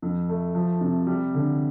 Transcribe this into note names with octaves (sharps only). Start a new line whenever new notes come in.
F2
A3
F3
C3
G3
D3